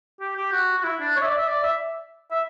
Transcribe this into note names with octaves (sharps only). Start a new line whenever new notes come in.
G4
G4
F#4
F#4
E4
D4
C#5
E5
D5
E5
D5
E5
E5